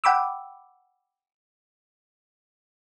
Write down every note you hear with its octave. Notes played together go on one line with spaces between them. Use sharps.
F#5 G5 B5 D6 E6